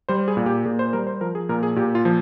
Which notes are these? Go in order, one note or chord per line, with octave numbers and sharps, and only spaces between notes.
G3 C5
G#4
A#2
G4
A#2 G#4
C5
G3 A#4
C5
F3 A#4
G#4
A#2 A#4
G#4
A#2 G4
F4
F3